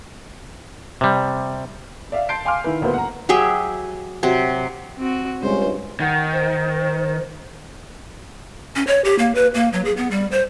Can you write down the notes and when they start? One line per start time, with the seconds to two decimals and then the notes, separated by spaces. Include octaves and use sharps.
1.01 C3 G3
2.12 D5 E5 F5
2.29 A5 C6 G6 C7 D7
2.45 F5 G#5 C6 D6 F6
2.64 D#3 E4 B4
2.81 D#1 D2 A#3 B3 B4 C5
2.94 F#5 A#5
3.29 F#3 G4 G#4 E5
4.23 C3 F#3
4.97 C4 F#4
5.42 C#2 G2 C#4 C5
6.00 D#3 F#5
6.33 C5
8.76 C#4
8.87 C#5
9.05 G4
9.19 A#3
9.35 B4
9.54 A#3
9.73 F#3
9.85 G#4
9.97 B3
10.11 G3
10.32 C5